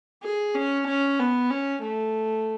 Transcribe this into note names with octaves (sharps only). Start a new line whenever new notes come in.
G#4
C#4
C#4
B3
C#4
A3